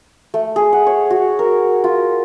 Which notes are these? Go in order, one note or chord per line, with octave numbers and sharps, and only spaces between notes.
A3
G#4
F#5
C#5
F#4
A#4
F4